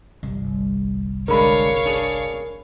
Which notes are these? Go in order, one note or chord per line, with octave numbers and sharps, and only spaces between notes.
G1 C2
D3 G#3 D4 A#4 C#5 F5 B5
D4 G#4